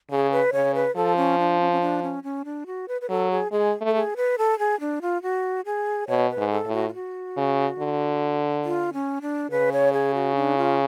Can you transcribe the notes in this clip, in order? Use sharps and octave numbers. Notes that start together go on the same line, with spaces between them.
C#3 G#4
B4
C#3 C#5
B4
F3 A4
C#4
D4
C#4
C#4
D4
C#4
C#4
D4
F#4
B4
B4
F#3 A4
G#4
G#3 G#4
A3
A4
G#4
B4
A4
G#4
D4
F4
F#4
G#4
B2 C#5
B4
G#2
A4
A2
F#4
F4
F#4
C#3
D3
F4
C#4
D4
C#3 B4
C#5
G#4
F#4
D4
F4